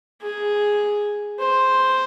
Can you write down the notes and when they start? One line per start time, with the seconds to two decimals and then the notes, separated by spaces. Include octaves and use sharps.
0.21 G#4
1.39 C5